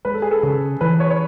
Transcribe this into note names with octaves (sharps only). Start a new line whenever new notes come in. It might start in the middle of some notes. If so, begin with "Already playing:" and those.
G#3 B4
A4
G#4
A4
C#3
E3 B4
C#5
C#5